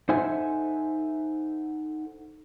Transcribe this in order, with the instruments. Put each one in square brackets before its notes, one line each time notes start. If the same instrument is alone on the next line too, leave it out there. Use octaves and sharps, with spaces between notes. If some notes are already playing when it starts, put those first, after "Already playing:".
[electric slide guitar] D#4 A4 C5 E5 F#5 G#5